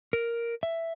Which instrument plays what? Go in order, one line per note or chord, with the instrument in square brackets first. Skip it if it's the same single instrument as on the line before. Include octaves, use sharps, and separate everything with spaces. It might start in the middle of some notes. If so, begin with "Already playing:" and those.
[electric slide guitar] A#4
E5